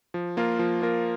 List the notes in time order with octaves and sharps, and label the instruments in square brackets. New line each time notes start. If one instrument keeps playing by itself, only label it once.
[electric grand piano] F3
A#3 F4 A#4
F3
A#3 F4 A#4